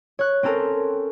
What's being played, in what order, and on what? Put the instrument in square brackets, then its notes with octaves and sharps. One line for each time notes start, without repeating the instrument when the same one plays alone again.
[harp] C#5 F#6
C4 C#4 A4 A#4